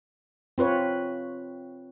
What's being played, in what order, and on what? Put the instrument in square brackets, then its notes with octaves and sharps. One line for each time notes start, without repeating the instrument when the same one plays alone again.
[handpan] C4 F4 B4 C#5